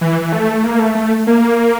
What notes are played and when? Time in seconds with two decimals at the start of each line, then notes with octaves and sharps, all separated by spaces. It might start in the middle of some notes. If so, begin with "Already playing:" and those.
0.01 E3
0.32 A3
0.64 A#3
0.79 A3
0.95 A3
1.27 A#3